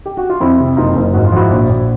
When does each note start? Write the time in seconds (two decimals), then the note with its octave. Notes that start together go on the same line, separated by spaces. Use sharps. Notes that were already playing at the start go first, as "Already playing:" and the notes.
0.06 G4
0.17 F#4
0.30 F4
0.40 F2 E4
0.59 C3
0.77 F#1 D#4 F4
0.95 F#1
1.13 G#2 F#4
1.26 F4
1.32 F3 E4 F#4
1.50 A#1
1.69 A#1